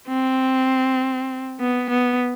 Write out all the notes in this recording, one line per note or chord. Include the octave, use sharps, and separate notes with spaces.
C4
B3
B3